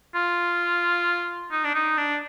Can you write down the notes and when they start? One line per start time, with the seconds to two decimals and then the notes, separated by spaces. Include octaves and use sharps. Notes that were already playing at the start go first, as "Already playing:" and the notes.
0.15 F4
1.52 D#4
1.65 D4
1.75 D#4
1.98 D4